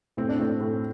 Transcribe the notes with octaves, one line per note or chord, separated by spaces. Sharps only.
A2 C4
D4
A2 C4
A2